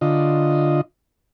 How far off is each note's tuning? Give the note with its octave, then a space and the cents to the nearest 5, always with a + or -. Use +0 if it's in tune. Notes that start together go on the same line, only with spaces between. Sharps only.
D3 +0 F4 +0 D#5 +0